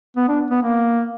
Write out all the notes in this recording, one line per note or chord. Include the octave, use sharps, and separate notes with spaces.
B3
D4
B3
A#3